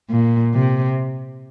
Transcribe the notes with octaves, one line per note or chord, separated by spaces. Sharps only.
A#2
C3